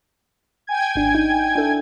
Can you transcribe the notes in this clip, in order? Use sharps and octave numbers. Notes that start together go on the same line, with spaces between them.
G5 G#5 G#6
G#1 D4
D#4
D4 E4 A4